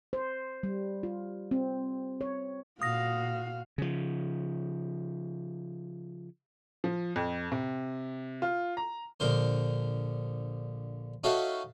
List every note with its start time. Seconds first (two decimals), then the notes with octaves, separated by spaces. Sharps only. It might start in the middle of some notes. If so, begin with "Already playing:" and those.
0.13 C5
0.63 G3
1.03 F4
1.51 C4
2.21 C#5
2.82 A#2 F#4 F5 D#6 A#6
3.78 C#3 F3
6.84 F3
7.16 F2
7.52 C3
8.42 F4
8.77 A#5
9.20 A#1 D3 A#4 C5
11.24 D#4 F#4 A4 C#5 E5 F5